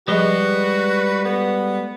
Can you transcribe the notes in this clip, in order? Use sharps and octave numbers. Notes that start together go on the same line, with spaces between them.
F3 G3 G#3 F#4 G#4 B4 D#5
B3 A4